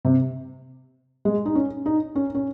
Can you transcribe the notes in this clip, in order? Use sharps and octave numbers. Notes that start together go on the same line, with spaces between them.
C3
G#3
D#4
C#4
D#4
C#4
C#4